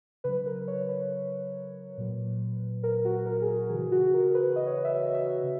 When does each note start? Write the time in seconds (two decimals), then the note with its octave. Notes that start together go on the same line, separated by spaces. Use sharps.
0.24 C#3 F#3 B4
0.46 A#4
0.68 C#5
0.89 B4
1.98 A#2 F#3
2.83 A#4
3.05 F#4
3.26 A#4
3.42 G#4
3.48 A#4
3.69 C#3 E3 G#4
3.92 F#4
4.14 A#4
4.30 A#4
4.34 B4
4.56 D#5
4.66 C#5
4.75 D#5
4.85 E5
5.03 D#5
5.14 E5
5.43 C#3